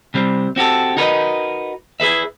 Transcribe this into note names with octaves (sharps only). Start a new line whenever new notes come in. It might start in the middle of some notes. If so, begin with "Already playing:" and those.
C3 G3 C4
C4 F#4 G4 A4
D#4 F#4 A#4 B4 C#5 D#5
E4 G#4 B4 E5